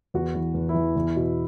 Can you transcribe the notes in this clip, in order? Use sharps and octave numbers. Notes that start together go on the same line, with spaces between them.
E2 F#4
E3
E2
E4
E3
E2
B2